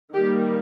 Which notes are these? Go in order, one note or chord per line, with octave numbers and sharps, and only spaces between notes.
D#3 G3 A#3 G4